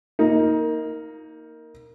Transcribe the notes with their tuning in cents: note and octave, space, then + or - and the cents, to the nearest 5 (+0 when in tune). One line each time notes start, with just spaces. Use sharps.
A#3 -5 D#4 +20